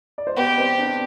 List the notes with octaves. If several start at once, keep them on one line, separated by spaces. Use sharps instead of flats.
D5
C5
B3 G4 B4
C4 C5
D4 D5